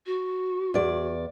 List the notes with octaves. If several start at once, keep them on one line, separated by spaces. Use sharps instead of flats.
F#4
E2 D5